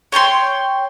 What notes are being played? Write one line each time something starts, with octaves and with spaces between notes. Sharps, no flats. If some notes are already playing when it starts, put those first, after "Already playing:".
C#5 G5 A5 C6